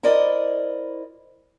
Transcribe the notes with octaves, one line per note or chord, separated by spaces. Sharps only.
E4 A#4 C5 D5 D#5